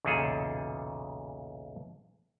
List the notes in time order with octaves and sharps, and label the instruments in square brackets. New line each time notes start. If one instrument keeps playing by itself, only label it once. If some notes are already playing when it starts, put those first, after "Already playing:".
[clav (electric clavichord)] B1 E2 A#2 C#3 G#4 A4